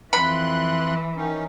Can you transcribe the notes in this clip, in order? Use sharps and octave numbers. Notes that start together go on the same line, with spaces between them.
F2 E3 B5 C6 F#6
D#3 C#4 D#4